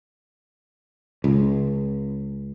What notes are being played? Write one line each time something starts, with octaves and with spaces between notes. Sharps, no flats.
C#2